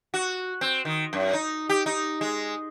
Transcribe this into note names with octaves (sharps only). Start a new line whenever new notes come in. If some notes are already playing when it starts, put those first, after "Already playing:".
F#4
C4
D#3
F#2
D#4
G4
D#4
G#3